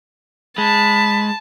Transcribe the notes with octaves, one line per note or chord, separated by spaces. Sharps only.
G#3 A5 B5